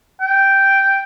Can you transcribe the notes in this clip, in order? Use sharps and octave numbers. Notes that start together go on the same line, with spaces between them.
G5